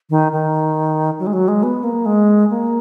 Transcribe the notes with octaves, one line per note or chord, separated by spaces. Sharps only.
D#3
D#3
F#3
G#3
F#3
G#3
B3
A#3
G#3
A#3